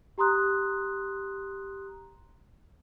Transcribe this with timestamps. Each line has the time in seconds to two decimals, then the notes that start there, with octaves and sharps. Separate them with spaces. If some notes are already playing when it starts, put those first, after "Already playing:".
0.18 G4 A#5 C6 D#6 F#6